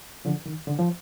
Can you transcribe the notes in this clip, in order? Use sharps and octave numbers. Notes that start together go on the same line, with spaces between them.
D3 F3
D#3
D3
F3